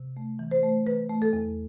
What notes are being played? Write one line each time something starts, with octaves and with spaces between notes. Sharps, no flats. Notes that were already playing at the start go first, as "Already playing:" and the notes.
Already playing: C3
A3
E3
C5
A3
E3 B4
A3
A4
E2